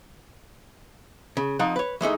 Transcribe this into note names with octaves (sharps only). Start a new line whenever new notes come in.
C#3
F2 F3 D#4 F#5
B4 C#5
E3 G#3 A3 D#4